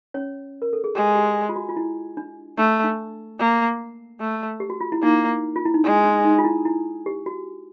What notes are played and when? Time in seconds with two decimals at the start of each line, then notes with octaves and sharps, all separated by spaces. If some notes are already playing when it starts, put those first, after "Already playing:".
0.14 C#4 C#5
0.62 A#4
0.73 A4
0.84 G#4
0.95 G#3 G4
1.15 G4
1.49 F4
1.56 F#4
1.69 F4
1.76 E4
2.17 D4
2.58 A3 D4
2.84 D4
3.40 A#3
4.21 A3
4.60 G4
4.70 F#4
4.81 F4
4.92 E4
5.03 A#3 D#4
5.56 F4
5.65 E4
5.74 D#4
5.84 G#3 D4
6.04 D4
6.25 D#4
6.39 F4
6.44 E4
6.65 E4
7.06 G4
7.26 F#4